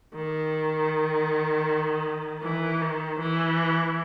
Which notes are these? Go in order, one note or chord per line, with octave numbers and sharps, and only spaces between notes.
D#3
E3
D#3
E3